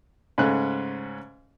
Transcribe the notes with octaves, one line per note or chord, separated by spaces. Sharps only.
G#2 C#3 A3 C#4 F#6